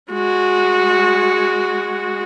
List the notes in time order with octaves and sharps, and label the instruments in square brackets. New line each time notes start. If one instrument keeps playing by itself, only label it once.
[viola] G#3 F#4